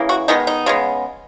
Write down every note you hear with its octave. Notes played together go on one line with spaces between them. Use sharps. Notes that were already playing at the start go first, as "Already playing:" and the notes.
Already playing: C#3 E3 A#3
F#4
D#3 G#3 B3 D#4
D#4
C#3 G#3 B3